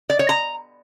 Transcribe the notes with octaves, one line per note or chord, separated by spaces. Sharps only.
D5
C#5
A#5